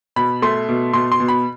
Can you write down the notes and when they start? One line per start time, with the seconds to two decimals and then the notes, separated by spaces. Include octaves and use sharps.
0.16 B2 B5
0.42 A3 C6
0.69 B2
0.93 B2 C6
1.12 C6
1.20 B2
1.28 B5